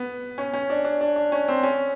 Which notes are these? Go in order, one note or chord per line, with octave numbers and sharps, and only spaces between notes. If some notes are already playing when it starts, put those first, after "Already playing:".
Already playing: B3
C#4
C#4
D4
D4
D4
D4
C#4
C4
C#4